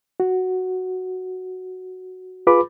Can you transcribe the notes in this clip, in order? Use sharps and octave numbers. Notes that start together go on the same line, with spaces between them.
F#4
F4 G#4 B4 B5 D6